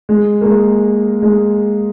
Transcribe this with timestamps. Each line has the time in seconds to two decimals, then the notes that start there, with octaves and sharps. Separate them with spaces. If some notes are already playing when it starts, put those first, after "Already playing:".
0.09 G#3
0.41 A#3
0.46 G#3
1.22 G#3